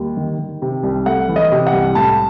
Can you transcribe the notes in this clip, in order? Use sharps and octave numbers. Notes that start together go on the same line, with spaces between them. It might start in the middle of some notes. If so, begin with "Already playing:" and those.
Already playing: D#2 G3
D#3
D#3
C3
C2
A3 F#5
E3
D#5
C3
F#5
C2
A2 A5